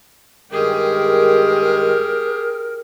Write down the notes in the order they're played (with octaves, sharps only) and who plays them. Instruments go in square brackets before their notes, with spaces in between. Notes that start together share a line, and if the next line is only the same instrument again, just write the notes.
[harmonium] G2 D#3 G#3 [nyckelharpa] G4 G#4 [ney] A#4